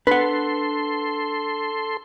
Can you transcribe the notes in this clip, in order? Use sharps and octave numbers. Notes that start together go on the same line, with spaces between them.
D4 A4 B4 F#5 C6